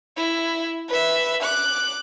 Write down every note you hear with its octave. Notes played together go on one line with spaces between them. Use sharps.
E4
B4 E5
D6 F#6